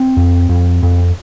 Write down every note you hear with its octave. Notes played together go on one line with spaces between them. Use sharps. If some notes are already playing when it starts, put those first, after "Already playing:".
Already playing: C4
F2
F2
F2